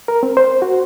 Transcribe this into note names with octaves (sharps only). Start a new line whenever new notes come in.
A#4
C4
C5
F#4